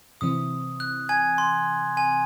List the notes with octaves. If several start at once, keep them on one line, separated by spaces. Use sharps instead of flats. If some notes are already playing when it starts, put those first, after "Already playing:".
C3 E3 C4 D#6
F#6
G#5 G#6
C6
G#5